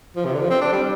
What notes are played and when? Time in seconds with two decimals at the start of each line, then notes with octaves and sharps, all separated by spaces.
0.16 F3
0.25 C3
0.34 D3
0.41 F3
0.50 C4
0.61 D4
0.73 G3